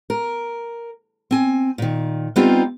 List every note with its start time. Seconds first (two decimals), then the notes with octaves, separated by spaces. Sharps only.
0.10 A#4
1.31 C4 G#5
1.78 A#2 D#3
2.36 G3 B3 C4 D#4 F4 G4